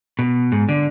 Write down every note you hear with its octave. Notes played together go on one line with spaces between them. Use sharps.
B2
G#2
D3